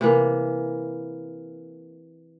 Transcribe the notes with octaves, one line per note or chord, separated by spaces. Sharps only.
C3 E3 A#3